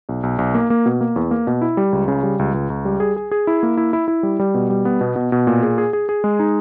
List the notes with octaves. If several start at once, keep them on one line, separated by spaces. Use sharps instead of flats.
B1
B1
B1
A#3
A#3
B2
A#3
E2
A#3
B2
E4
G3
C#2
C#3
G3
C#2
C#2
C#2
G3
G#4
G#4
G#4
E4
A#3
E4
E4
E4
G3
G3
B2
G3
B3
B2
B2
B2
A#2
G#4
G#4
G#4
G#4
G#3
D#4